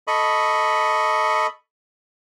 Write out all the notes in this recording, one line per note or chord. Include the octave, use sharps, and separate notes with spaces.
A4 D#5 B5 C#6